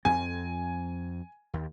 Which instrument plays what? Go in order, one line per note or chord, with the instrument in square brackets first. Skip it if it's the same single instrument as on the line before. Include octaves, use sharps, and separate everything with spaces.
[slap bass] F2 C4 [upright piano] G#5
[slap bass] D#2